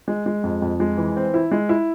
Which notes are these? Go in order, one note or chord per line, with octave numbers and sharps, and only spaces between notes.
G#3
G#3
F2
F2
G#3
E3
C4
E4
G#3
E4